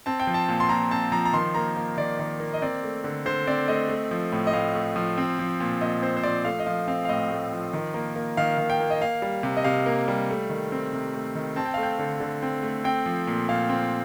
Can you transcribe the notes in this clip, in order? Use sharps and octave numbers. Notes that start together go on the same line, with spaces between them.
C4 A5
G5
F3
A5
A#2
C6
A#2 A#5
C4 A5
F3 A#5
A#5
D#3 C6
A#3 A#5
A#3
D#3 D5
D#3
A#3
D#5
C4 D5
A3
D3
D3 C5
C4 D5
A3 D#5
A3
F3
A2
D#5
A2 F5
A3
F3
C4
F3
A#2
A#2 D#5
C4 C5
C5
F3 D5
A3 F5
D#5
F3 F5
C4 F5
F5
A2 D#5
A3
F3
D#3
A#3
A#3
D#3 F5
D#3
G5
A#3
D#5
A#3 F5
G3
C3
D#5
C3 F5
A#3
G3
A3
D#3
C4
C3
A3
D#3
C4 A5
G5
A3 F5
G5
D3
D3
C4
A3
C4 G5
F3
A#2
A#2 F5
C4